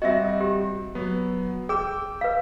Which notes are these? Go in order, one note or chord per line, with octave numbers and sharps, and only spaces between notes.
G3 C4 F#4 D#5 E5
G4
F#3 B3
G#4 G5 E6
B4 F5